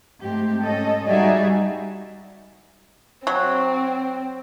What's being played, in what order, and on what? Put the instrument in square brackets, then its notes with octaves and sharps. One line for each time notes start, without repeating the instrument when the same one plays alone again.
[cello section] G#2 A3 C4 G4
C#4 A4 D#5
G3 D#4 F#4 G#4 D5 E5
[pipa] F#3 [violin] C4